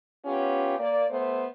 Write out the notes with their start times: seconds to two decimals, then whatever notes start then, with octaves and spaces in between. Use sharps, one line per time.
0.25 B3 C#4 F4 G4
0.79 A#3 D5
1.10 A3 B3 C5